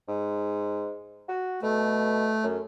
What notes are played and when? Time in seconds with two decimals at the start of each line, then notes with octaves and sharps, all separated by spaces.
0.08 G#2
1.29 F#4
1.63 B2 A3
2.44 F#2